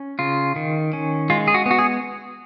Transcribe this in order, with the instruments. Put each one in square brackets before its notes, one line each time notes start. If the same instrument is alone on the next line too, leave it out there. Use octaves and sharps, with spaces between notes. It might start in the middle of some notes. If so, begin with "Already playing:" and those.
Already playing: [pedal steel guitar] C#4
C#3 F4
D#3
C#4
G#3 F4
G#4
F#4
B3 F#4
G#4